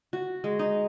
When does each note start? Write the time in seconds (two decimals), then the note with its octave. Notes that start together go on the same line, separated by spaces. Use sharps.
0.13 F#4
0.44 G#3
0.59 D#4